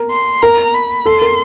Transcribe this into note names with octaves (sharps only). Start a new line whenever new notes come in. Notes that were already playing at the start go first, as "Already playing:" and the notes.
Already playing: A#4
C6
A#4 A#5
B5
A4 C6
A#4